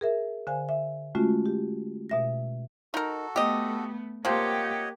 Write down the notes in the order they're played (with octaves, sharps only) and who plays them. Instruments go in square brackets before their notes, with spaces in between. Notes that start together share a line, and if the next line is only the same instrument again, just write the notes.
[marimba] G#4 A#4 E5
D3 C5 F5 G#5
E5
G#3 A3 C#4 F4 F#4
G4
B2 E5 A#6
[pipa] D#4 A#4 [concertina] F#4 A4
[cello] A3 B3 [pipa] G4 D#5
[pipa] F3 C4 [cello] A#3 G4 [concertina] C#5 D#5 F#5